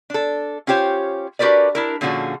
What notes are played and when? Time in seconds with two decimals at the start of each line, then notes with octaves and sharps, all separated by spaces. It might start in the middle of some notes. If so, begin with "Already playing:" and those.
0.10 D4 A4
0.67 C#4 F4 G4 C5 C#5
1.39 D4 F#4 G4 A#4 B4 D5
1.75 D4 E4 A#4
2.01 A#2 D3 F3 C#4 F#4 G#4